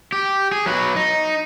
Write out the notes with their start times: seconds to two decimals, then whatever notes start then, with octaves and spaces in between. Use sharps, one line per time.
0.12 G4
0.52 G#4
0.66 F#3 B4
0.96 D#4